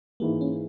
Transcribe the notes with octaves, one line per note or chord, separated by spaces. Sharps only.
G#2 E3 G#3 A#3
C#4